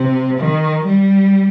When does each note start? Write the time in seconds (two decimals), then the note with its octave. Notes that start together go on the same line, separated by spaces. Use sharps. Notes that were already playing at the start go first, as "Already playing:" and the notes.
Already playing: C3
0.39 D#3
0.86 G3